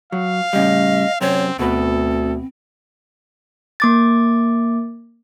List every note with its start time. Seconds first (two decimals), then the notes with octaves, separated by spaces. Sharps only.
0.12 F#3 F5
0.53 A2 C#3 G3 D#5
1.21 F#2 C3 C4 C#5
1.59 D2 B2 C4 A4 B4
3.80 A#3 D6 A6